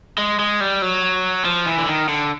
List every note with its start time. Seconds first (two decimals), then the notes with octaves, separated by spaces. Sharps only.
0.18 G#3
0.39 G#3
0.61 G3
0.82 F#3
1.45 F3
1.66 E3
1.78 D3
1.88 D#3
2.08 D3